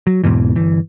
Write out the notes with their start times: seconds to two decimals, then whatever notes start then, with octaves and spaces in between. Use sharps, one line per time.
0.07 F#3
0.24 E2 G#2 B2 E3
0.56 G1 E3